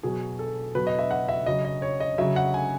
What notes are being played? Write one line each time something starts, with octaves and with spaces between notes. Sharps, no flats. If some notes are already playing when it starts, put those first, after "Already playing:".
B2 F#3 G#4
A4
B2 F#3 B4
D#5
E5
F#5
E5
C#3 F#3 D#5
D#5
C#5
D#5
C#3 F#3 E5
F#5
G#5